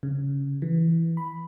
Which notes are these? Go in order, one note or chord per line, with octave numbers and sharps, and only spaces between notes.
C#3
E3
B5